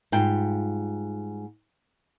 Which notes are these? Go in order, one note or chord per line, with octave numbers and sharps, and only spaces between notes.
G#2 G3 F4 G5